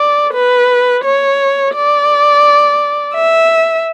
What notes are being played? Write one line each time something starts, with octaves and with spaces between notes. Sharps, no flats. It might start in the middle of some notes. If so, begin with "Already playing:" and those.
Already playing: D5
B4
C#5
D5
E5